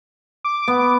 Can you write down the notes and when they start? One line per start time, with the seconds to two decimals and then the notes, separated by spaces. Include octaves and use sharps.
0.45 D6
0.68 B3